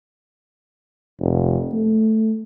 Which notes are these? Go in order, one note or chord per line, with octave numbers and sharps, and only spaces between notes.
F1
A3